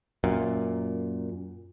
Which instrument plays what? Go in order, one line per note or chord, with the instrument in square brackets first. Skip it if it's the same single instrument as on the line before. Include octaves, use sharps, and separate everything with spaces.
[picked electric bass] F#2 A#2